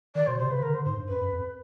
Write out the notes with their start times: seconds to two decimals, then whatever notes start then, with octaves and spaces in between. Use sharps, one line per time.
0.15 D#3 D5
0.27 B2 C5
0.39 C3 C5
0.51 C#3 B4
0.62 D3 A#4
0.74 D3 C5
0.85 G#2 C5
0.97 G2
1.08 F#2 B4
1.21 F#2
1.32 F2